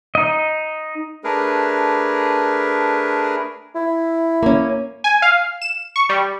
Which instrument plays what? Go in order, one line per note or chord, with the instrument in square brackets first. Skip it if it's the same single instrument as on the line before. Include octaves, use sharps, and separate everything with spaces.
[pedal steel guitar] D#4 D#5
[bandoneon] A3 D4 G#4 A#4 B4
[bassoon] E4
[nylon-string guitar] A#3 C#4
[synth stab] G#5
F5
E7
C#6
G3